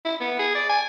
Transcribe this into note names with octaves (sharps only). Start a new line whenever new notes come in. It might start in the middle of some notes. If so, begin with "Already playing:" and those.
E4
B3
G#4
D5
G#5